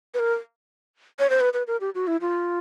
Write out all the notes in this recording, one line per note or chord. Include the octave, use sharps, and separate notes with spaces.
B4
A#4
C#5
C5
B4
B4
A#4
G4
F#4
E4
F4